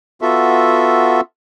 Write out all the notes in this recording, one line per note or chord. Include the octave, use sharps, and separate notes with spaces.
B3 F4 F#4 A4 E5